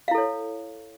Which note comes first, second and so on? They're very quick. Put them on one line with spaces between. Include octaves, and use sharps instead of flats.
F5 E4 A4 C#5